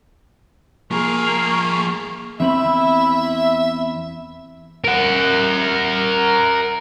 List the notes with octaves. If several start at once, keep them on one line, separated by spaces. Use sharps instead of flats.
F3 A#3 G#4 C#6
E2 C4 E4 E5 B5
A#4 F#5